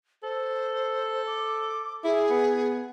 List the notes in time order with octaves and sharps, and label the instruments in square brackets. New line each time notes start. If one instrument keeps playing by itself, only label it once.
[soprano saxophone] A4 [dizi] C5
[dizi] D6
[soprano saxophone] E4 [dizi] G#4
[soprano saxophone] B3